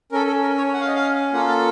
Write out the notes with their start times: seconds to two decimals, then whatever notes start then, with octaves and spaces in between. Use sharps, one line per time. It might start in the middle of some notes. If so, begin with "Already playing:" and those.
0.12 C#4 A4 A#4
0.27 A4
0.42 A#4
0.58 C#5
0.73 F#5
0.81 F5
0.87 D#5
0.95 F5
1.33 A#3 F4 A4 F#5
1.49 A5